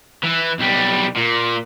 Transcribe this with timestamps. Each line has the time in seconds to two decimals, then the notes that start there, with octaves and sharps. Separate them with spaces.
0.23 E3
0.59 B1 G3
1.17 A#2